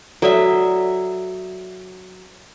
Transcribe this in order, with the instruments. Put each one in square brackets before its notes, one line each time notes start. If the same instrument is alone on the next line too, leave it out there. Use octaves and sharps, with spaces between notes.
[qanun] F#3 E5 [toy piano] A4 D5 D#6